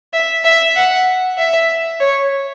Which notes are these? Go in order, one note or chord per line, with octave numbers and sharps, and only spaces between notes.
E5
E5
F#5
E5
C#5